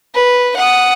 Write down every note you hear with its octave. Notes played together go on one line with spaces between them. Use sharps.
B4
F#5 D#6